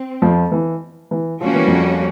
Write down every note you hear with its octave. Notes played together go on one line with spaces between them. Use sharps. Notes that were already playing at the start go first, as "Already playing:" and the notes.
Already playing: C4
F2 F3
E3
E3
F3 G3 A#3 C#4 F#4
E3
F2 F3